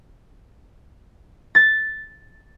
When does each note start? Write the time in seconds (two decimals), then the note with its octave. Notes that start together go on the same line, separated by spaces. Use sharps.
1.55 A6